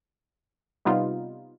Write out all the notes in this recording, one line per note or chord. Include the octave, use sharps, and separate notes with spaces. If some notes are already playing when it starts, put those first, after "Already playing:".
C3 G3 B3 D#4 F4